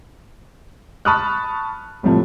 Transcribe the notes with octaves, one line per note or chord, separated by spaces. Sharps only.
A5 B5 C#6 D#6 F6 F#6
C2 A2 C3 F3 A3